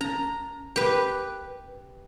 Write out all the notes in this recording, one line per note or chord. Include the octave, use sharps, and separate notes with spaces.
C#4 A#5
G4 B4